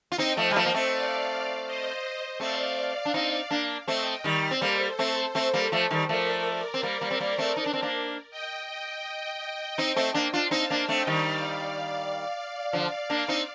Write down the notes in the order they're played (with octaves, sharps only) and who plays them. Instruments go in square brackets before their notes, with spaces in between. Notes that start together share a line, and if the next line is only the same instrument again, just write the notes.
[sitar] F4
[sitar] C4 D#4 [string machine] D#5 G5
[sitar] F3 A3
G3
F3 A3
A#3
A3 C4
[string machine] D5 F5
C5 D#5
[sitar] A3 C4 [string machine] D5 F5
[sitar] D4
C4 D#4
A#3 D4
[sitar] A3 C4 [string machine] D#5 G5
[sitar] D#3 G3
C4
[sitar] G3 A#3 [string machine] A4 C5
[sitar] A3 C4
A3 C4
G3 A#3
F3 A3
D#3 G3
[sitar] F3 A3 [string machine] A#4 D5
[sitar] C4
G3 A#3
G3 A#3
C4
G3 A#3
A3 C4
D#4
D4
C4
A#3 D4
[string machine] D#5 G5
D#5 G5
[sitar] C4 D#4
A3 C4
A#3 D4
D4 F4
[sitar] C4 D#4 [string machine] F5 A5
[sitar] A#3 D4
[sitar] A3 C4 [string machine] D#5 G5
[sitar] D#3 G3
[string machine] D5 F5
[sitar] D3 F3
A#3 D4
C4 D#4